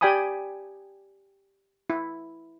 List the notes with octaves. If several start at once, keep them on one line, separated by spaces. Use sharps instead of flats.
G4 D5 G5 G#5 B5 D#6
E4